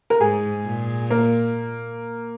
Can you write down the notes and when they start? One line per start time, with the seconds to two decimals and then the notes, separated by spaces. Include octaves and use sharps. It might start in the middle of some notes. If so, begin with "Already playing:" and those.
0.10 A#4
0.20 G#2 G#4
0.65 A#2
1.10 A#3